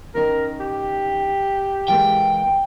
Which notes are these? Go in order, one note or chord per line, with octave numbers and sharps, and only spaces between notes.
D#3 C#4 A#4
G4
E3 G#3 A#3 G5